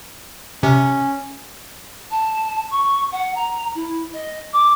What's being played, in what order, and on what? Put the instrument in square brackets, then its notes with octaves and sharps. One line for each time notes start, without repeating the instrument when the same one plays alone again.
[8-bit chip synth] C3 [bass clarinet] C#4
[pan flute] A5
C#6
F#5
A#5
E4
D#5
D6